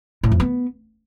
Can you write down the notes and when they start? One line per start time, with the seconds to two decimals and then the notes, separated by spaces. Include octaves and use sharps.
0.23 A2
0.32 F2
0.40 B3